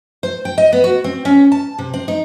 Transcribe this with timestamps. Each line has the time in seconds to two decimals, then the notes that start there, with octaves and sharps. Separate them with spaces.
0.23 C5
0.45 G5
0.58 D#5
0.72 B3
0.84 F#4
1.04 C4
1.25 C#4
1.52 A5
1.78 C3
1.94 C4
2.08 D#4